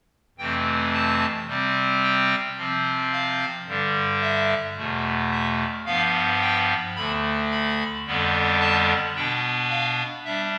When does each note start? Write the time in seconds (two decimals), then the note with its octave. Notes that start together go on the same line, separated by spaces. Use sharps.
0.38 F2 C3 E3 A3 C4 G5
0.93 A5
1.47 C3 G3 C4
2.03 G5
2.57 C3 F3 C4
3.13 F5
3.66 G2 D3 G3
4.21 E5
4.76 E2 B2 A3
5.31 E5
5.86 G2 F3 B3 F5
6.41 G5
6.95 D2 D3 A3 B5
7.51 B5
8.06 F2 D3 G3 B3
8.60 A5
9.15 B2 B3 D4 G5
9.70 F5
10.25 G3 D4 E5